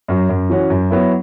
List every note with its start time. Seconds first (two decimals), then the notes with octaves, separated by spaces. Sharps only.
0.08 F#2 F#3
0.29 F#2
0.50 E3 C#4 F#4
0.70 F#2
0.91 F#3 B3 E4